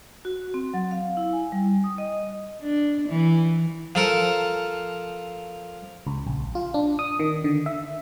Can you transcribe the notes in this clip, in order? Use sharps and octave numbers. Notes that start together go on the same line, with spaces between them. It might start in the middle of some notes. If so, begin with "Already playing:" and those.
F#4
C4
F#3
F5
E4
G#5
G3
D#6
D#5
D4
E3
F3 A4 A#4
C#2
A#1
F4
D4
D#6
D#3
D3
E5